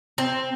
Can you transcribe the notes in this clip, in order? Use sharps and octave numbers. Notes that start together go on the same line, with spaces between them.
C4